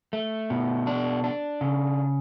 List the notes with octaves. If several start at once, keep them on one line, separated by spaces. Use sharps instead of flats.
A3
B2
D4
D4
C#3